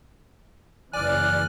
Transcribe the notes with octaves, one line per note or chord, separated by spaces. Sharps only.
F#1 E3 D5 G#5 F6 F#6